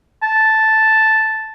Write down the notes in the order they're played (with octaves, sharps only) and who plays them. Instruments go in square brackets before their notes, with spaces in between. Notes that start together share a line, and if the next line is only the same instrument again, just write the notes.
[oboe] A5